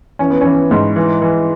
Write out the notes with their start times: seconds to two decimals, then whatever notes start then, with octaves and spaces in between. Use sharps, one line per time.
0.19 E3 C#4
0.30 B3
0.41 E3 C#4
0.71 G#2
0.96 E3
1.22 E3